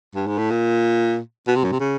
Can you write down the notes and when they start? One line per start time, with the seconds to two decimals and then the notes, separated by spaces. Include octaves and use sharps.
0.15 G2
0.27 G#2
0.38 A2
0.50 A#2
1.47 B2
1.56 C3
1.64 F#2
1.72 C3
1.80 C#3